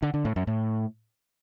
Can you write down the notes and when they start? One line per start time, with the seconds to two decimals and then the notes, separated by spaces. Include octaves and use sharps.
0.03 D3
0.14 D3
0.25 A2
0.36 F#2
0.47 A2